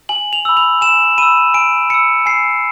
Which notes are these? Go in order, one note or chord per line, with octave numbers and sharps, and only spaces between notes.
G#5 F#7
F7
B5 E6
F7
G#5 E7
B5 E6 D#7
G#5 D7
B5 E6 C#7
G#5 C7